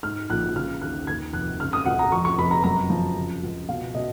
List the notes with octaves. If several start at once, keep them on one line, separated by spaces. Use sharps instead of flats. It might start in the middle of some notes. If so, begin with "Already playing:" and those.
G#2 F6
A#1 F#6
C#3 F6
D#2 F#6
D#2 G#6
F1 F#6
C#3 F6
D#6
C#2 F#5
A#5
F2 C#6
C#6
F1 B5
A#5
F#2 A#5
F3
C#3
C#2
B2 F5
B2 D#5